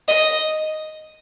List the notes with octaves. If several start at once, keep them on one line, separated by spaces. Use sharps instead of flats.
D#5